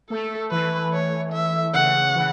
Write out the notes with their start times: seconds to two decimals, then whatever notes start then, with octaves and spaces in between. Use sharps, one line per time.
0.10 A3 A4
0.51 E3 B4
0.93 C#5
1.33 E5
1.74 C#3 F#5
2.15 E3